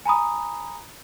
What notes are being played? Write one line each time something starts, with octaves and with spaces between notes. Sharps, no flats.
G#5 A#5 B5 D#6